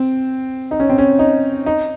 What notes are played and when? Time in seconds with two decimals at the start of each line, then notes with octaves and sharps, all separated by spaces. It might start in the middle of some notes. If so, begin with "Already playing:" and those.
Already playing: C4
0.71 D#4
0.80 C#4
0.89 C4
0.98 C#4
1.19 D#4
1.66 D#4